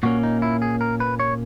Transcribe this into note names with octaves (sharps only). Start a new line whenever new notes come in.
A#2 A#3 C#4 F#4
D#4
E4
G#4
A#4
B4
C#5